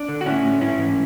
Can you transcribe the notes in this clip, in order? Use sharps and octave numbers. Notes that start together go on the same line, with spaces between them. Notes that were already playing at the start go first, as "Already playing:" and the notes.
Already playing: D4
D3
F#4
A2 C#4 E4
A2
G#2 C#4 E4
E3